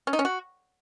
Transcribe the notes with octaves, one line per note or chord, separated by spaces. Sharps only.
C#4
D#4
C#4
F#4